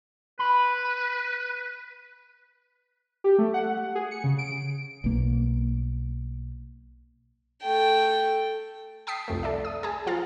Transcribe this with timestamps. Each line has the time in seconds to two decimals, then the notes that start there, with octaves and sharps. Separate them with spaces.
0.39 B4 B5
3.24 G4
3.38 A3
3.54 F#5
3.95 G#4
4.11 C#7
4.24 C#3
4.38 D7
5.04 B1 A#3
7.62 A3 G5
9.07 G5 A5 D#6 B6 C7
9.28 C2 F2 A3
9.43 A4 D5 E5
9.65 D#6
9.83 G#4 A5
10.06 F3 F4 F5 A#5 A6